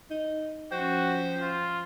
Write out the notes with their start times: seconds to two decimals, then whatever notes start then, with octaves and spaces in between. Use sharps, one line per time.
0.11 D#4
0.72 F3 C#4 F#4 C5 G5
1.41 F4